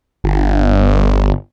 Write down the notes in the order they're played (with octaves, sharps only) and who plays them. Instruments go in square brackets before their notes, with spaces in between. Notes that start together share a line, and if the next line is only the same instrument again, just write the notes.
[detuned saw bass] G1